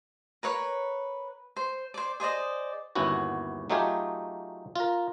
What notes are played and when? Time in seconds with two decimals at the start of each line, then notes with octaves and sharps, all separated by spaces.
0.43 A#4 B4 C#5
1.56 C5
1.94 C5 D5
2.20 G#4 C5 D5 D#5
2.95 G1 D#2 B3 C#4 E4 F#4
3.70 F#3 A3 D#4 F4 G4 G#4
4.76 F4 A#4